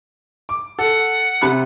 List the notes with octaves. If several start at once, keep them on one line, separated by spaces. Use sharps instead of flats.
D6
A4 F#5
C3 B5 F#6